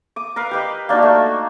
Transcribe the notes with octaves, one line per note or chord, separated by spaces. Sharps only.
D6 D#6
A#4 B4 F5
G4 B4 D#5
A#3 D4 D#4 F#4
A3 A#3 C#6